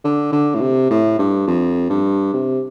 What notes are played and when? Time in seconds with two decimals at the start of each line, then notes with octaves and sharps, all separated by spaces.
0.04 D3
0.32 D3
0.55 A2
0.61 C3
0.90 A2
1.19 G2
1.47 F2
1.90 G2
2.33 C3